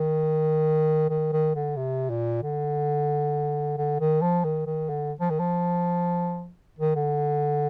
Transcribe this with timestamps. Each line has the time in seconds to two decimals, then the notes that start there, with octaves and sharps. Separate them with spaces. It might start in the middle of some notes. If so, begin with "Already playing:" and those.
Already playing: D#3
1.10 D#3
1.33 D#3
1.55 D3
1.77 C3
2.10 A#2
2.43 D3
3.77 D3
4.00 D#3
4.22 F3
4.44 D#3
4.67 D#3
4.89 D3
5.20 F3
5.30 D#3
5.39 F3
6.79 D#3
6.95 D3